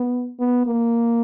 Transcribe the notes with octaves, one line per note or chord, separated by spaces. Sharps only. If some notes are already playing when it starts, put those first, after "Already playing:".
Already playing: B3
B3
A#3